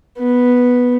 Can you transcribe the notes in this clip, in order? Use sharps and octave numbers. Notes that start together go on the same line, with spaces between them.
B3